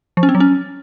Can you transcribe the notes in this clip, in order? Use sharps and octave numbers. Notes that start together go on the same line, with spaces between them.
F3
C#4
C4
F#3
C#4